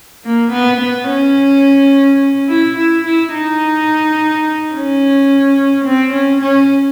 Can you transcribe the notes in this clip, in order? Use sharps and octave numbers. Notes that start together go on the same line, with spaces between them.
A#3
B3
B3
C#4
E4
E4
E4
D#4
C#4
C4
C#4
C#4